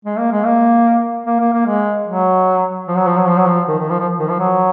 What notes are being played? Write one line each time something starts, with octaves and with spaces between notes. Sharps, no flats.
G#3
A#3
G#3
A#3
A#3
A#3
A#3
G#3
F#3
F3
F#3
F3
F#3
F3
F#3
F3
D#3
D#3
F3
F3
D#3
F3
F#3